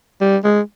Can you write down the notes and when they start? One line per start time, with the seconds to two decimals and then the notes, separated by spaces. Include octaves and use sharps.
0.21 G3
0.44 G#3